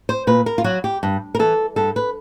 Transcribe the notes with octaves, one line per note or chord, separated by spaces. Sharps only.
C5
A#2 B4
A#4
F4
F#3 F#4
G4
G2
A#4
E3 A4
G2 A4
B4